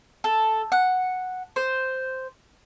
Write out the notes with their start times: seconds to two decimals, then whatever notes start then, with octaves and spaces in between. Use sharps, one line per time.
0.24 A4
0.72 F#5
1.56 C5